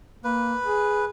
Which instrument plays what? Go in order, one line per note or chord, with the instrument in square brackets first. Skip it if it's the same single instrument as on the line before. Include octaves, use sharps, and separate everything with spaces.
[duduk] A#3 [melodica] B4
[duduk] G#4